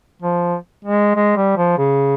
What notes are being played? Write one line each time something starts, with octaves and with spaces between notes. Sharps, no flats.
F3
G#3
G#3
G3
F3
C#3